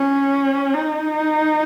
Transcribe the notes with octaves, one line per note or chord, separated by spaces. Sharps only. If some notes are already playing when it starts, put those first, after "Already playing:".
Already playing: C#4
D#4